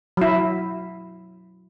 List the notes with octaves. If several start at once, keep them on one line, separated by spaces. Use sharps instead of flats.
F#3 E4